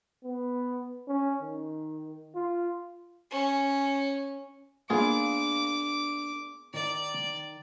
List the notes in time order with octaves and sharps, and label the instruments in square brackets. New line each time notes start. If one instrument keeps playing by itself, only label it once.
[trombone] B3
C#4
D#3
F4
[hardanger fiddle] C#4
[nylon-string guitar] A#3 D4 F5 [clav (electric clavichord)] B3 F4 G#4 [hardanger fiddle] D6
[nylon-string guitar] D#3 [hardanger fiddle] D5